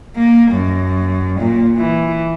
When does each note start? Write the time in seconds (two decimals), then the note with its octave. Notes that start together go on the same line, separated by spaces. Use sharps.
0.16 A#3
0.51 F#2
1.39 A#2
1.77 E3